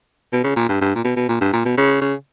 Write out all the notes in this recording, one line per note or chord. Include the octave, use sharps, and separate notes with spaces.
B2
C#3
A#2
G2
G2
A#2
B2
B2
A#2
G2
A#2
B2
C#3
C#3